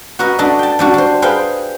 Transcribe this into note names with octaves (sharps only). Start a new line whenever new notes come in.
F#4 A#4 B4 D#5
D4 F#4 A4 D#5 E5
G5 A5
G3 D4 F#4
D4 C5
G#4 B4 C5 F5 G5